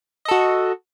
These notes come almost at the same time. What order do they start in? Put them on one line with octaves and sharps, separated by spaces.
D#5 A4 F#4